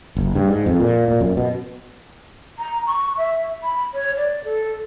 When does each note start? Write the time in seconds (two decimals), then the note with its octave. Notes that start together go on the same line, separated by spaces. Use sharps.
0.17 F#1
0.35 G2
0.48 G#2
0.66 F2
0.80 A#2
1.08 A#2
1.21 F#2
1.37 B2
2.59 A#5
2.87 C#6
3.17 E5
3.63 B5
3.94 C#5
4.17 D5
4.44 A4